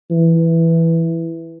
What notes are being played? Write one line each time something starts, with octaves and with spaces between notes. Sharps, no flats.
E3